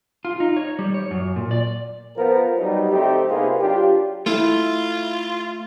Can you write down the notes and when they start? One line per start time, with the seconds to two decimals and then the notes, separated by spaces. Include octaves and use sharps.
0.25 F4
0.40 D#4
0.57 C#5
0.79 G3
0.94 C#5
1.11 F#2
1.36 A#2
1.51 D5
2.17 F3 B3 A#4
2.57 F#3 G3 D#4
2.90 D3 A3 C4 D#4 G4
3.30 C3 A#3 B3 D#4 F4 G#4
3.60 F#3 D4 F4 G4
4.26 A3 E4 F4